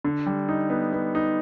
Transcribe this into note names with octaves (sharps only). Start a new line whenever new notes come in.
D3
G3
D#4
B3
B3
D#4